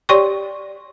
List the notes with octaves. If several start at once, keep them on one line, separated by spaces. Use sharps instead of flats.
G4 C#5 D5 G5 C6 C#6